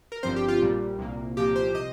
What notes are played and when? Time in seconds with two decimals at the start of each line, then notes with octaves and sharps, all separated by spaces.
0.12 A#4
0.23 G1 G2 F3 C4 C5
0.36 G4
0.48 F4
0.62 A#1 A#2 G3
0.99 C2 A#2 A#3
1.37 C2 A#2 F3 A#3 G4
1.56 C5
1.75 C3 D#5